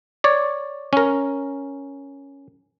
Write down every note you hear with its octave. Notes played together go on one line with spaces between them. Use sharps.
C#5 D5
C#4 A#4